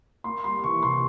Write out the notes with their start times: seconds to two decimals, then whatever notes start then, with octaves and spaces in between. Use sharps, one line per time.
0.24 A#3 C6
0.44 G3 C6
0.64 E3 C#6
0.83 C3 C6